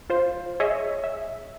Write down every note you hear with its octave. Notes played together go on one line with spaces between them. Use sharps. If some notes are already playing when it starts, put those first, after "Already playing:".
F4 C5
G#4 C#5 D#5 E5
E5